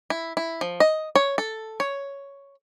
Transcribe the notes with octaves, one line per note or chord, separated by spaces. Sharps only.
E4
E4
F3
D#5
C#5
A4
C#5